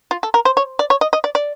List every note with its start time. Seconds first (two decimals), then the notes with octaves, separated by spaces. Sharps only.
0.11 F4
0.23 A4
0.34 A#4
0.45 C5
0.57 C#5
0.79 D5
0.90 C#5
1.01 D#5
1.13 D#5
1.24 D5
1.35 D5